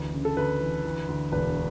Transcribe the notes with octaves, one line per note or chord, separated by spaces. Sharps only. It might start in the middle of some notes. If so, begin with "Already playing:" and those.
Already playing: D2 E3
C#3
A4
D2 B4
E3
E3
D2
E1 B4